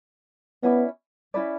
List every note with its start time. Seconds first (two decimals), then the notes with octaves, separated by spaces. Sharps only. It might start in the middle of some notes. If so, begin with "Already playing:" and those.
0.63 B3 C#4 E4 B4 D5
1.34 C#4 E4 B4 D5